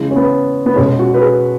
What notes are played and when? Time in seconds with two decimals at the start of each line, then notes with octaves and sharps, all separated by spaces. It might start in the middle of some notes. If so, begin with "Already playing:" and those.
Already playing: C#3 E3 G#3
0.11 C#4
0.16 B3
0.66 B3
0.76 B2 G#3 C#4
0.99 F#4
1.14 B4
1.21 G#4